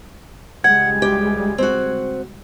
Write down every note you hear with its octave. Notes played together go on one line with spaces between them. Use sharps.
C#2 G3 G#3 F#5 G#6
D2 G4
C4 F#4